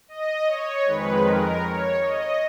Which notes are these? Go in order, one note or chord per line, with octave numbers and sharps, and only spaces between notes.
D#5
C#5
F2 D#3 G#3 B4
A#4
C#5
D#5